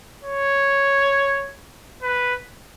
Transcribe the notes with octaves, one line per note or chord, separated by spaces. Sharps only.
C#5
B4